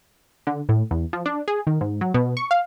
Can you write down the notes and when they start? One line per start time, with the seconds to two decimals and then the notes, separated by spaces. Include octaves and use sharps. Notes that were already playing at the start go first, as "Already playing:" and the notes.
0.47 D3
0.69 A2
0.91 E2
1.13 F3
1.26 D4
1.48 G#4
1.67 D#3
1.81 G#2
2.01 F#3
2.14 B2
2.37 C#6
2.51 F5